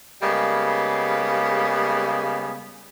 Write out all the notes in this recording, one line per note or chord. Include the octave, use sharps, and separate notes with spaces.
C#3 G3 G#3 A#3 B3